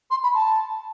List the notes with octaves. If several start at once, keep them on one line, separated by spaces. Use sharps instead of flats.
C6
B5
A5